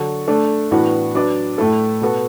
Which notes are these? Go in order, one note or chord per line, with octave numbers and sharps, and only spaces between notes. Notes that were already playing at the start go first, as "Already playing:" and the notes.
Already playing: D3 F#3 D4 F#4 A4
A3 D4 A4
A2 E3 B3 D4 F#4
F#3 D4 B4 D5
A2 A3 E4 A4
B2 B3 F#4 A4